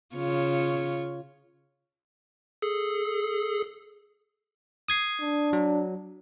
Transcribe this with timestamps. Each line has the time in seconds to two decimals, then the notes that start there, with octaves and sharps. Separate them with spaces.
0.15 C#3 F4 C#5
2.62 G#4 A4
4.88 D#6 G#6 C7
5.21 D4
5.53 F#3